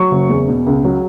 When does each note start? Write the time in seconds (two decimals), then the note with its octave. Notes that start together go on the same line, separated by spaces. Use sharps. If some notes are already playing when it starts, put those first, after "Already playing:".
Already playing: F#3 C#6
0.11 F#1
0.29 E2
0.48 B2
0.67 C#2
0.85 F#3